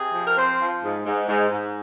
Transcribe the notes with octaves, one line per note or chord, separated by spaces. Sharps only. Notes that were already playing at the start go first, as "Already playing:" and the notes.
Already playing: C3 G#4
F3
A#4
C4 C5
F3
G#2
G#2
G#2
G#2